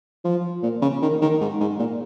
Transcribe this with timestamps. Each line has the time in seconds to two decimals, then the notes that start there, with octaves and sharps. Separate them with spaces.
0.25 F3
0.63 A#2
0.82 C#3
1.02 D#3
1.22 D#3
1.41 G#2
1.60 G#2
1.79 A#2